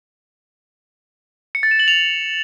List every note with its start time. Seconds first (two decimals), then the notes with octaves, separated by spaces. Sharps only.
1.55 C#7
1.63 A6
1.71 E7
1.80 F#7
1.88 F7